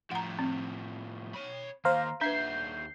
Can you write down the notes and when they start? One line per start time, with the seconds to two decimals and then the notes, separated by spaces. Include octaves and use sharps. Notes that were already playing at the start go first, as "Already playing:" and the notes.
0.11 A2 F3 F#5 A#5
0.39 C4
1.35 C#5 B5
1.85 D#3 A#3 C5 F5 A#5
2.21 D#2 D4 B4 E5 G6 C7